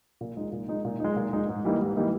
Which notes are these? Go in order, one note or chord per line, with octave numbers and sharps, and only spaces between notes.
A#2
G#3 D#4
A#2
G#3 D#4
A#2
G#3 D#4
A#2
G#3 D#4
G#2
E3 G3 A#3 D#4
G#2
E3 G3 A#3 D#4